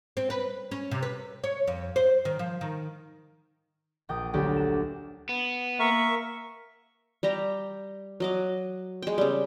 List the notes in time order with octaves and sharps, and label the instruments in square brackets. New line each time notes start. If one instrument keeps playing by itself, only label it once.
[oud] C4
B4
C#4
C3
B4
C#5
F2
C5
D#3
F3
D#3
[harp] A#1 G5 D#6
D2 F#3 G4 D5
E7
[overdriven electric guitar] B3
[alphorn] A#3 [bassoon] A#4 [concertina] E5 C#6
[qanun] G3 G4 A#5
F#3 D#5 D6
G#3 G5
C#3 G3